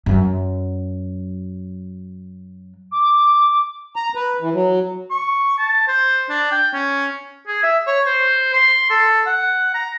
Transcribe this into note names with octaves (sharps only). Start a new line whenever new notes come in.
F#2 F#3
D6
A#5
B4
E3
F#3
C#6
A5
C5
D4
G5
C#4
G#4
E5
C#5
C5
C6
A4
F#5
A#5